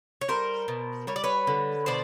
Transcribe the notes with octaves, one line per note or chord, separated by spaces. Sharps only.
C#5
G3 A#4 C5
B2
G3 C#5
D5
B4 C#5
D3
B2 C5 D5